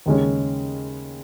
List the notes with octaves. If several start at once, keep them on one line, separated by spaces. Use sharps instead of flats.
D#2 C#3 G#3 C#4